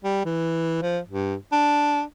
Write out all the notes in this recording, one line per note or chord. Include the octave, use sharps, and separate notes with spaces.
G3
E3
F3
G2
D4